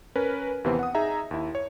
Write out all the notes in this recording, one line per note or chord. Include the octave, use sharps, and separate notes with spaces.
C#4 A#4 B4
D#2 C3 E3 B3 C4
F#5 D#6
D#4 G#4 E5 A#5
D#2 E4
C#5